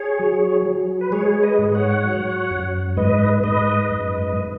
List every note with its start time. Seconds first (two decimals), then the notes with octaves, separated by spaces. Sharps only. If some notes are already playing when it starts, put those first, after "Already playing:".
Already playing: G#4 C#5
0.19 F#3
0.66 F#3
1.01 B4
1.12 G#3 G#4 C#5
1.43 B4 D#5
1.59 G#2
1.73 C#5 F#5
2.05 F#3
2.51 F#2
2.97 G#2 B4 D#5
3.44 G#2 B4 D#5
3.90 F#2